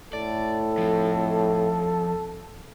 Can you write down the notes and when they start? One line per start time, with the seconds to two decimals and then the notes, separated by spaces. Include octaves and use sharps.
0.13 A2 A4 D5
0.78 F3 C4